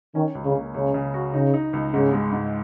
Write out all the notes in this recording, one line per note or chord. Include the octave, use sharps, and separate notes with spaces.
D#3 C#4
C#2
C#3
A#3
C#2 C#3
C#3
F#4
C#3 D#4
D#4
C#2
G#2 C#3
G#3
G#2